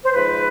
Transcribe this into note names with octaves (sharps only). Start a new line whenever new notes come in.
C5
G#2 F3 B4